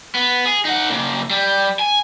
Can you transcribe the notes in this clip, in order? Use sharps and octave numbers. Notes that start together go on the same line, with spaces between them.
B3
G#4
D#4 F#5
C#3 A#3
G3
G#5